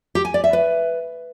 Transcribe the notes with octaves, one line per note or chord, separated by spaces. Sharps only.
G4
G#5
D5
E5
B4